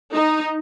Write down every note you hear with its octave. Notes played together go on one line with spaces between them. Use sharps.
D#4